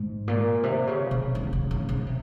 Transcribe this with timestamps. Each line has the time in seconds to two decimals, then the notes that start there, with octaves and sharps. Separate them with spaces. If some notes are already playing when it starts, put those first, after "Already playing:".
Already playing: G#2
0.28 A#2
0.63 C3
0.87 C#3
1.11 C3
1.35 C#3
1.53 C#3
1.71 C#3
1.89 C#3
2.07 C3